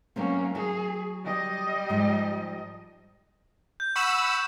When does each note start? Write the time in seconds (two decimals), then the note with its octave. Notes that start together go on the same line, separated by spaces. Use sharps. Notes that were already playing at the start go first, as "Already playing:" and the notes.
0.16 F#3 A3 A#3 C4 C#4
0.55 F#3 G#4
1.24 G3 D#5
1.90 G#2 F3
3.80 G6
3.96 F#5 B5 C#6 E6 E7